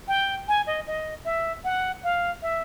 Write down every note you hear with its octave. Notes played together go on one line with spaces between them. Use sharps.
G5
G#5
D#5
D#5
E5
F#5
F5
E5